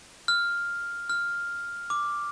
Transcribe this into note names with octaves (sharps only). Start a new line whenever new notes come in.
F6
F6
D6